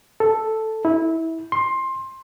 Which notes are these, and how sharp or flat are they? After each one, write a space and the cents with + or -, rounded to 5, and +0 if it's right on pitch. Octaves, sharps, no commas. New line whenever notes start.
A4 +0
E4 -20
C6 +15